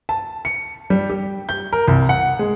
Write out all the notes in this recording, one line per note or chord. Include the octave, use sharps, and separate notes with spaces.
A5
C#7
G3
G4
G6
A#4
C2
F#5
G#3